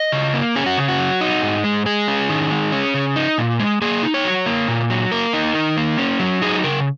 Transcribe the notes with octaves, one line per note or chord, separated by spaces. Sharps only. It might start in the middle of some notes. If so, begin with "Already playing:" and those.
Already playing: D#5
C#3
A#3
C#4 G#4
F#4
C#3
F#4
F#3
D#4
G#2
G#3
G#3 G#4
C#4
D#3
G#3
C#4
C#3
D#4
A#2
G#3
A#3 G#4
D#4
C#5
F#3
A#3
A#2
F#3
A#3 A#4
D#4
D#3
A#3
C#4
F#3
D#4 G#4
C#3 A#4